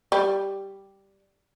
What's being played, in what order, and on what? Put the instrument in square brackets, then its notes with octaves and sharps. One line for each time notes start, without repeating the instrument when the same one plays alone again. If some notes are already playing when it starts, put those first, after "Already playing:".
[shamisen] G3